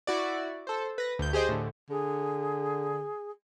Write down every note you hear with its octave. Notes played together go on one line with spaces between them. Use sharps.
E4 F#4 D5
A4 C5
B4 A#6
D2 G6
G4 G#4 C5 D#5 G5
A2 D3
D3 G#4